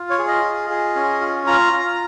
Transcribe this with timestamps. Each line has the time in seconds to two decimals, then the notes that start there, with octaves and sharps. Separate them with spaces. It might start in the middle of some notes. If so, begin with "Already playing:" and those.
Already playing: F4
0.10 C#5
0.19 G#4
0.28 D#5
0.44 F4
0.70 G#4
0.96 C#4
1.21 F4
1.47 F4 A#5
1.73 F4